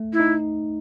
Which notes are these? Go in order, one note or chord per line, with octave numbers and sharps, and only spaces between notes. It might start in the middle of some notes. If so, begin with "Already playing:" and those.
Already playing: A3
E4
D#4